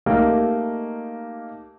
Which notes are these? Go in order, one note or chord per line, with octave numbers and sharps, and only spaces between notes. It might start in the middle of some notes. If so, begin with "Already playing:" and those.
A3 A#3 D#4 G4 A#4